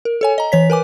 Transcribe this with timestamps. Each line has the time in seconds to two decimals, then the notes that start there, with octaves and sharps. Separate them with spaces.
0.05 A#4
0.21 A4 C#5 G#5
0.38 D#5 A#5
0.52 E3 C#5 B6
0.70 A#4 B4 G#5 D6